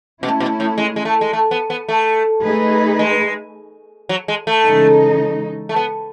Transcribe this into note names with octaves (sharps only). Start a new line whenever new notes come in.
B2 A3 C#4 E4
B2
A2
G#3
G#3
A3
G#3
A3
B3
B3
A3
A3 D#4 G#4 B4
G#3
F#3
G#3
A3
C#3 E3 G#3 D#4
A3
B3